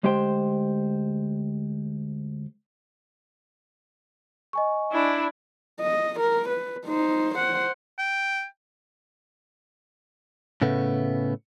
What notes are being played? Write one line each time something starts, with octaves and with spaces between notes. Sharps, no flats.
D2 G#3 G4 C5 G5 C6
D#5 G#5 C#6
D4 E4
D#5
A#4
B4
D#4 C5
C5 F#5
G5
A2 C#3 A3 B3